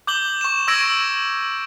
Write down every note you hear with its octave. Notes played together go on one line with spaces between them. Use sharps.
D6 G6 F#7 G7
C#6 E7
C#6 E6 G#6 A#6 D7